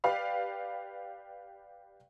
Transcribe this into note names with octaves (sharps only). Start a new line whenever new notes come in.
G4 B4 D5 F5 B5